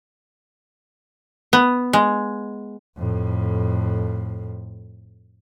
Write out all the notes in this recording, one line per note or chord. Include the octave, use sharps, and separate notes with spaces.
B3
G#3
F2 A2